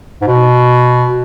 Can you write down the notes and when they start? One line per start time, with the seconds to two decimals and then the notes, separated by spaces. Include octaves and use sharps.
0.22 G#2
0.27 B2